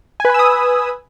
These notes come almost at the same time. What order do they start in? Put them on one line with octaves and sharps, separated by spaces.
G#5 B4 B5 E6 D#6